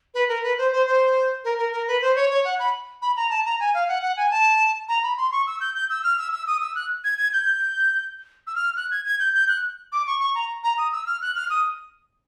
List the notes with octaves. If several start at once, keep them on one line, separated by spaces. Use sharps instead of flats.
B4
A#4
B4
C5
C5
C5
A#4
A#4
A#4
B4
C5
C#5
C#5
F#5
B5
B5
A#5
A5
A#5
G#5
F5
F#5
F#5
G#5
A5
A#5
B5
C6
C#6
E6
G6
G6
E6
F6
E6
E6
D#6
E6
F#6
G#6
G#6
G6
E6
F6
F#6
G#6
G#6
G6
G6
F#6
D6
C#6
C#6
A#5
A#5
D#6
E6
F6
F#6
F6
D#6